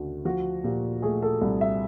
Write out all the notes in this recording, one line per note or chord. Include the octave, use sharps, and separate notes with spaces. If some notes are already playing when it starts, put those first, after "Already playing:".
Already playing: D2 C#3 A3
F3 F#4
A#2 G4
A3 G#4
A4
C2
E5